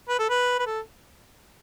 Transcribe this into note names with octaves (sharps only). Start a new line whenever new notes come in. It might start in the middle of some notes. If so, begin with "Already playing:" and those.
B4
A4
B4
B4
A4